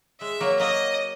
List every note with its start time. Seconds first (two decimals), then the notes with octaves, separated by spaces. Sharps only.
0.21 G#3 E5
0.40 F#3 A#3
0.60 F#3 A#3 D#5